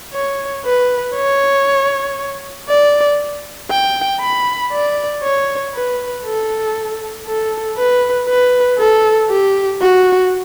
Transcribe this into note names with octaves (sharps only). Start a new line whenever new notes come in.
C#5
B4
C#5
D5
G5
B5
D5
C#5
B4
A4
A4
B4
B4
A4
G4
F#4